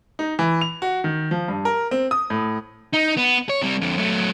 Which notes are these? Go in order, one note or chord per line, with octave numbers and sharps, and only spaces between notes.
D#4
E3
F7
F#4
D#3
F3
G2
A#4
C4
D#6
A2
D#4
B3
C#5
C3 G3
F2 D3
F#3 A3